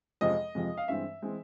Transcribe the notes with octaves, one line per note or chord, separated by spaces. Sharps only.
F2 C3 F3 G#3 D#5
F2 C3 F3 G#3
F5
G2 E3 G#3 C4 E5
E3 G#3 C4